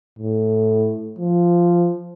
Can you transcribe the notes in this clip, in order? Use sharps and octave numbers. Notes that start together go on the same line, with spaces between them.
A2
F3